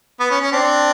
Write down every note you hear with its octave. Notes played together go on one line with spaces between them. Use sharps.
B3
C#4
C#4
C4 D4